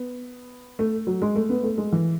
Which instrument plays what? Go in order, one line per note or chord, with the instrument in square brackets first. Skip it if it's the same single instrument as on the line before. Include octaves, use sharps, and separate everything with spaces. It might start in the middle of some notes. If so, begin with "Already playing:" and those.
Already playing: [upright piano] B3
A3
F#3
G#3
A3
B3
A3
G#3
E3